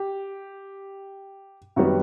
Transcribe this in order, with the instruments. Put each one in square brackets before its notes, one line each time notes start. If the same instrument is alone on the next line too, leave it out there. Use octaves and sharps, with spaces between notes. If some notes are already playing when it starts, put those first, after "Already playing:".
Already playing: [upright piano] G4
F#2 D#3 G3 B3 F#4